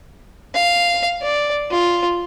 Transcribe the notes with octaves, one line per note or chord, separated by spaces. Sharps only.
F5
D5
F4